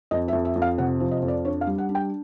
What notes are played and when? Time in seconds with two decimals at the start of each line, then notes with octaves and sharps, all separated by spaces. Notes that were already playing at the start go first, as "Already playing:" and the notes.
0.11 F2 D#5
0.28 E5
0.33 F2
0.45 E5
0.56 F2
0.62 F5
0.78 C3 F#5
1.00 F3
1.11 D#5
1.22 F2
1.28 D5
1.45 D4 C#5
1.61 F5
1.67 G3
1.78 F#5
1.89 D4
1.95 G5